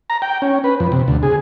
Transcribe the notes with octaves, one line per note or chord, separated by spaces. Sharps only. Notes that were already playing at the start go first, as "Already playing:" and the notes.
A#5
G5
C#4
B4
F2
C3
D2
G#4